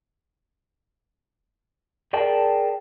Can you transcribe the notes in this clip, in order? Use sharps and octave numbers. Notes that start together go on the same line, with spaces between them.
G#4 A#4 D5 G5 A5